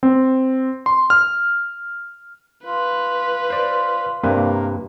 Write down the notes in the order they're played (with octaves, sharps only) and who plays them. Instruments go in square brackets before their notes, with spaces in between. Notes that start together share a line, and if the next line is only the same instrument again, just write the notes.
[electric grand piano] C4
C6
F6
[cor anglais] F4 [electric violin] B4
[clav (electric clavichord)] C5 D5
[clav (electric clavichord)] G2 C3 B4 [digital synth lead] A#3